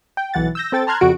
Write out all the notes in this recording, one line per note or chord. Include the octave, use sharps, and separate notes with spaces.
G5
B1 E3 F#5 A6
E6 G6 A#6
C4 A4 G5 A6
A5 A#5 C6 F6 F#6 G#6
F2 C#3 F#4 D7